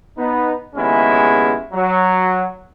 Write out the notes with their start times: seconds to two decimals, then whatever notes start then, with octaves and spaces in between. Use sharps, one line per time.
0.17 B3 D#4 B4
0.75 D#2 C#3 G#3 B3 C#4 E4
1.72 F#3